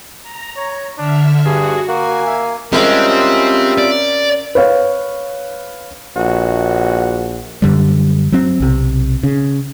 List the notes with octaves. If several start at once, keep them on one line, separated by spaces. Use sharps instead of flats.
A#5
C#5
D3 D4 E5 F6
G2 F#4 G#4
A#3 F#4 G#5
E5
G3 G#3 C4 C#4 F4 A#4 C5 E5
D5
B4 C#5 F5
A#1 F#4
F#2 D3 G3
F#3 C4
B1 C3
C#3